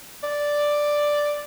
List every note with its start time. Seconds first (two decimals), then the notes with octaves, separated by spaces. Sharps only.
0.23 D5